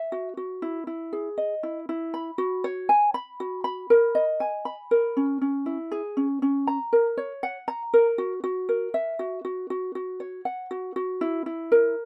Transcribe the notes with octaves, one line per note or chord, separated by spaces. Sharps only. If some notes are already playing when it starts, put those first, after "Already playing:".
Already playing: E5
F#4
F#4
E4
E4
G#4
D#5
E4
E4
B5
F#4
C#5
G#5
B5
F#4
B5
A#4
D#5
G#5
B5
A#4
C#4
C#4
E4
G#4
C#4
C#4
A#5
A#4
C#5
F#5
A#5
A#4
F#4
F#4
A#4
E5
F#4
F#4
F#4
F#4
C#5
F#5
F#4
F#4
E4
E4
A#4